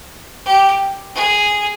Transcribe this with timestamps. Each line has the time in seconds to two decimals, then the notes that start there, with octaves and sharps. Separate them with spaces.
0.46 G4
1.15 G#4